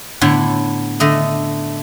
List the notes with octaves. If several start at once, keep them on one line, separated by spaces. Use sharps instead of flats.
A2 D3 B3 C#5
D3 A3 D#5